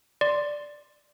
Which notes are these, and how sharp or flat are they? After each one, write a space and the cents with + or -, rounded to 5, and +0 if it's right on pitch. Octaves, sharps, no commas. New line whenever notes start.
D5 +0 C6 +0